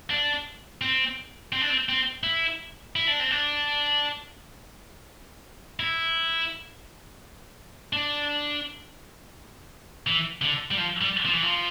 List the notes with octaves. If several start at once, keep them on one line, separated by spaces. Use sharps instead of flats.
D4
C4
C4
D4
C4
C4
E4
E4
D4
C4
D4
E4
D4
E3
D3
G3
F3
G3
F3
E3
F3